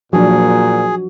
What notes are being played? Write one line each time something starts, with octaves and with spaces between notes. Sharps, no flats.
A#2 F3 F#3 D4 F#4 G#4